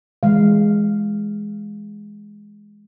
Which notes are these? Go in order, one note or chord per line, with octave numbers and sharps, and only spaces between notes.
E3 G#3 F5